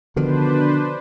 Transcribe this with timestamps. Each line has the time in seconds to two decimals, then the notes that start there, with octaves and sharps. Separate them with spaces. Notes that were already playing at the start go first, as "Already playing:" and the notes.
0.16 B2 D3 D#3 F3 D4 B4 C5